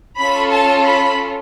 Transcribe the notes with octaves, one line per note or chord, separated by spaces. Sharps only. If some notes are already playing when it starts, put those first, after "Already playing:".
C#4 F4 A4 B5
A5
B5